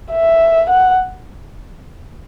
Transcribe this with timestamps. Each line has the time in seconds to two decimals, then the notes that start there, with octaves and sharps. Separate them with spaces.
0.12 E5
0.69 F#5